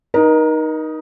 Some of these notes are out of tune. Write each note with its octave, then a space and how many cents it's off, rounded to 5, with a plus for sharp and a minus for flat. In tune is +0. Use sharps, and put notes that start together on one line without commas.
D#4 +0 A#4 +35